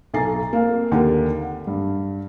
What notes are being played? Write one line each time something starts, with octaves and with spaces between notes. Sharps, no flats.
B1 A4 G#5 A#5 A6 C7
A#3 C4 F5
D#2 D3 G4 A#4 F#5
F#5
G2